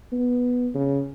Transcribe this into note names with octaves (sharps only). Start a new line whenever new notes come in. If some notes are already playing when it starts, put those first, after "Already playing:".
B3
C#3